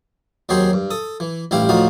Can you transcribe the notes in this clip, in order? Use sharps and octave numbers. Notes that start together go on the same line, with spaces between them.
D#2 F#3 C4 G#4 G5 C6
G2
A4 D#6
E3
A1 G2 E4 G4 F5 G5
D2 A2 F3 D#4 F#4 F5